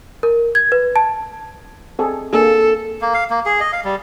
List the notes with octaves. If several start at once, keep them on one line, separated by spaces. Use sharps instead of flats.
A#4
G#6
B4
A5
C4 G#4 A4
A#3 D4 G#4 A4
A#3
F5
A#3
G#4
D#5
F5
G3